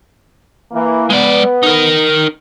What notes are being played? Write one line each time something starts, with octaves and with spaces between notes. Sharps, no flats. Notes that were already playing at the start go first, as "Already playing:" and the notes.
E3 A#3
G#3 B3 D5
D#4 A#4